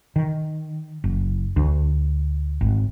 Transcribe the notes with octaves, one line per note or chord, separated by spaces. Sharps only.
D#3
F#1
D2
G#1